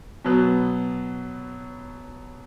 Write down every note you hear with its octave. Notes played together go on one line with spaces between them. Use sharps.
B2 F#3 B3